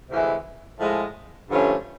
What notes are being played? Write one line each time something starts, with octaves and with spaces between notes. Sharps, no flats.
D2 C3 E3 G#3
A2 F3 G#3
G2 D3 F3 A3 C#4